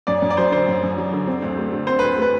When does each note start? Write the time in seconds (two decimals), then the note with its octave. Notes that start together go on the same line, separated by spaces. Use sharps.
0.07 F#2 D5
0.22 F#2
0.30 D5
0.37 F#3 C5
0.52 D3 C5
0.68 F#2
0.83 F#2
0.98 F#3
1.13 D3
1.27 C4
1.42 D2
1.58 A3
1.73 D3
1.87 C4 C5
1.99 D2 B4
2.18 A3 B4